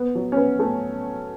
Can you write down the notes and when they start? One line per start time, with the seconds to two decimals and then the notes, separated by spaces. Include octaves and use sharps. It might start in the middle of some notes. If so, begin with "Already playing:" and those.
Already playing: B3
0.15 F#3
0.32 C#4
0.37 B3
0.59 A3